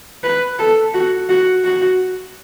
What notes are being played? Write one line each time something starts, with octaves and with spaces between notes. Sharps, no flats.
B4
A4
F#4
F#4
F#4